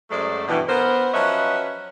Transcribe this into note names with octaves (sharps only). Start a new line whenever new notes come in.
F#2 F#3 G#3 A3 C5 D5
G2 B2 E3
B3 A#4 C5
F3 F#3 C#4 B4 D#5 E5